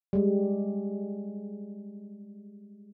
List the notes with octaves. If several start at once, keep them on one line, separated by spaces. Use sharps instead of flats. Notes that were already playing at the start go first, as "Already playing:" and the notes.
G3 G#3